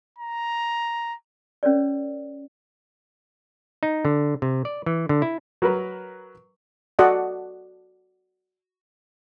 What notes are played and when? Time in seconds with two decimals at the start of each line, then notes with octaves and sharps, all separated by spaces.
0.18 A#5
1.63 C#4 A#4 C#5 D5
3.83 D#4
4.05 D3
4.42 C3
4.65 D5
4.86 E3
5.09 D3
5.22 E4
5.62 F#3 A#4 B4
6.99 F#4 A4 D5 D#5 F#5